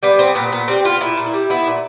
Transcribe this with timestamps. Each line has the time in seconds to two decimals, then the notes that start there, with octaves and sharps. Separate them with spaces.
0.03 G3 B3
0.19 B3 C4
0.35 A#2 B3
0.52 A#2 B3
0.68 G3 C4
0.85 B3 F4
1.01 A#2 E4
1.17 A#2
1.26 E4
1.33 G3
1.50 B3 E4
1.67 A#2